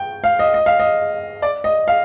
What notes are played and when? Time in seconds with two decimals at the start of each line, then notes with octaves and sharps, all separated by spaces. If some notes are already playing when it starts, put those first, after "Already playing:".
Already playing: G5
0.24 F5
0.39 D#5
0.54 D#5
0.66 F5
0.80 D#5
1.42 D5
1.64 D#5
1.88 F5